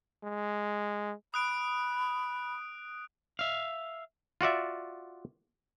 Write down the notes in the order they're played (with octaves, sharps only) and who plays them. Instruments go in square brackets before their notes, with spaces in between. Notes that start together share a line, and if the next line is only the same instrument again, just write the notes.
[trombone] G#3
[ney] B5 [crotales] D#6 F#6 D7
[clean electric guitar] E5 F5
[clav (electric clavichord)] F4 F#4 D5 E5